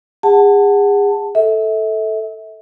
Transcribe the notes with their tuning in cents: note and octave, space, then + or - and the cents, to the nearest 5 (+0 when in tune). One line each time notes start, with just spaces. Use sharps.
G#4 -35 F#5 +5 A5 +10
A4 +0 E5 -35